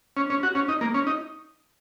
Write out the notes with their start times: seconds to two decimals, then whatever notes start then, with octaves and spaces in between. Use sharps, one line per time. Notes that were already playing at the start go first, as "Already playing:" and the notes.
0.17 C#4
0.30 C#4
0.43 F#4
0.55 C#4
0.69 D#4
0.81 A#3
0.94 C#4
1.07 D#4